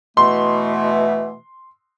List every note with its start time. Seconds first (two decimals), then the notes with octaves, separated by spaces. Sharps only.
0.17 B2 E3 A3 C6